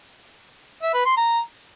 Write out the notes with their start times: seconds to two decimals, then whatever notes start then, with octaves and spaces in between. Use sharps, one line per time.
0.82 E5
0.94 B4
1.05 C6
1.17 A#5